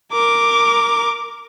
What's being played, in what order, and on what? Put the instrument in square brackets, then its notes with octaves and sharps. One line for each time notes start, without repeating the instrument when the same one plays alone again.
[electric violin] A#4 D6